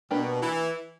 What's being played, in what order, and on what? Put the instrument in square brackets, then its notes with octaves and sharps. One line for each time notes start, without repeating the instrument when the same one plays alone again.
[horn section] B2 [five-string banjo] A#3 D4 G4 B4
[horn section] E3